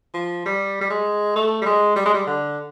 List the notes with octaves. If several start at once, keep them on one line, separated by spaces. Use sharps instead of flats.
F3
G3
G3
G#3
A3
G3
G#3
G3
G#3
G3
D3